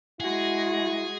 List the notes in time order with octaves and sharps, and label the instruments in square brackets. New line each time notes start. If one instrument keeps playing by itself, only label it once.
[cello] G#3 F#4 [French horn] E4 [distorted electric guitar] G#4